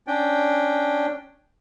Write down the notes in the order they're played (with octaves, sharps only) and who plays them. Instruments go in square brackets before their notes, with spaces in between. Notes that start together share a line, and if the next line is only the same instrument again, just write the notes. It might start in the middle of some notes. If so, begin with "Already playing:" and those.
[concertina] C#4 D4 G5